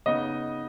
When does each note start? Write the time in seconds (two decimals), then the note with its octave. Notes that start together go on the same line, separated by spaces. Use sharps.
0.06 C#3 B3 D#4 D#5